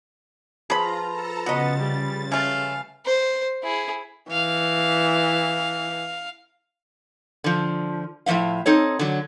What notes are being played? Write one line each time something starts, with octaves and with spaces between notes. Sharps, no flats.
F3 F4 G#4 B4 C5 A#5 B5
A4 A5 A#5
C#3 B3 F#4 D#5 A6
G3
A3 C#4 F5 G#5
C5
E4 G#4
E3 F5
D3 F3
A2 F3 A#3 E5 F5
C4 D#4 A4 C#5
D3 F#3